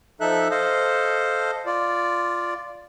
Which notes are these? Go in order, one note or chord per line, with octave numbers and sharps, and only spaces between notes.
F3 D#4 A4 E5 F#6
A4 C5 D#5 F5
F4 D5